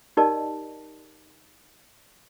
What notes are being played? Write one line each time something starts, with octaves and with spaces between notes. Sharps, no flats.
D#4 G4 A#4 D5 D#5 A5